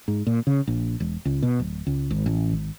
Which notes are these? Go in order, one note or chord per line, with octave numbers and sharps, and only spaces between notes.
G#2
A#2
C#3
A#1
E1
C#2
B2
D1
C#2
G#1
A1
G#1